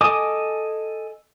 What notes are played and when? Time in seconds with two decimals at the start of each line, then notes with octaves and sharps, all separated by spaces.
0.01 A4 D#5 G#5 D6 D#6